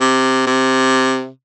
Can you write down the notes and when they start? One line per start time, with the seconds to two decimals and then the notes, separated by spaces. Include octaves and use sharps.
0.01 C3
0.46 C3